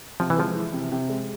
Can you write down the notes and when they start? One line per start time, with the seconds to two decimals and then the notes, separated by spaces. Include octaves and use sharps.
0.20 C3 F3
0.30 E3
0.38 F3 G#3
0.55 E3
0.73 C3
0.92 C3
1.09 G#3